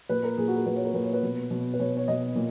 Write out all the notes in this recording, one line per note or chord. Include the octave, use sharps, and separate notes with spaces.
A#2 B4
A#4
A#2 G#4
F#4
A#4
A#2 B4
C#5
A#4
A#2 B4
C#5
B4
B2
B2
B4
B2 C#5
C#5
B2 D#5
A#2